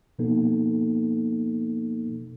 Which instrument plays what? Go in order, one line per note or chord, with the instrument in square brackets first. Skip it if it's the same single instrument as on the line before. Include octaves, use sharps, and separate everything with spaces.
[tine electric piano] B2 F3 A#3 B3 D#4 A4